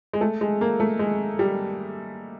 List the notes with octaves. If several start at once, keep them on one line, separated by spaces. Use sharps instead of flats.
G#3
A3
G#3
A#3
A3
G#3
G3